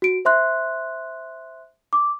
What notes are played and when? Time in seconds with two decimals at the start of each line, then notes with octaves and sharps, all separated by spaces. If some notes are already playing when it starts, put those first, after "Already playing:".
0.02 F#4 D7
0.25 C5 E5 C6 F#6
1.93 D6